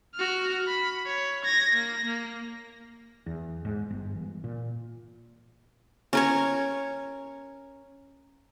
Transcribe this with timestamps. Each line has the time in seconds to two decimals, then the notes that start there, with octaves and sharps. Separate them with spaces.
0.15 F#4 F6
0.68 B5
1.06 C#5
1.45 G#6 A#6
1.74 A#3 A#6
2.05 A#3
3.26 E2
3.65 G#2
3.90 G1
4.16 E3
4.44 A#2
6.13 C#4 A#4 C#5